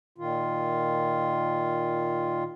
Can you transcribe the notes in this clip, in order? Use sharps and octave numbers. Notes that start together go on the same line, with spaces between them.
A#2 D#3 F4